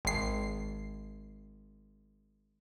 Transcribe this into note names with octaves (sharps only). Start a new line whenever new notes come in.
G#1 C7